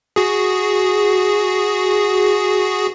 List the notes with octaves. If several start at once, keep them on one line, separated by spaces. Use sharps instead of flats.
F#4 G#4